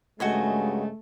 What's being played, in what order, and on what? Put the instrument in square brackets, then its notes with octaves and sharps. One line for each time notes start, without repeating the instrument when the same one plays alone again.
[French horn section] G2 C#3 G#3 [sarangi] A3 [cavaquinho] F#4 D#5 G#5